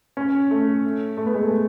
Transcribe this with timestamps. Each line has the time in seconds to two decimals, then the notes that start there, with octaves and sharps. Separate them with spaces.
0.17 C#4
0.51 A3
1.17 A3
1.26 B3
1.34 G#3
1.43 A3